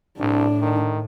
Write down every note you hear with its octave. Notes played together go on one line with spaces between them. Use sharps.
C2 A2 D4
D#3